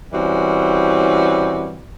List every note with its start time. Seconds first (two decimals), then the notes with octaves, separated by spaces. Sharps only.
0.13 E3 G3 C4 C#4 F#4